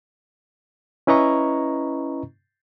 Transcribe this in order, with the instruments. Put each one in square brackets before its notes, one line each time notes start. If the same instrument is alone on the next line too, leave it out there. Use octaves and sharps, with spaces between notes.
[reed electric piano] C#4 E4 B4 D#5 A#5 C#6